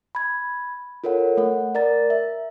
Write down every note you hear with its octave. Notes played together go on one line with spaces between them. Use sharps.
B5 G#6
F4 A4 A#4 C#5 F#5
A3 F#5
A#4 D5 A#5 A6
E5